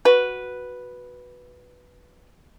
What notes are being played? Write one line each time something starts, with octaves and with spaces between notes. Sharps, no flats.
F#4 B4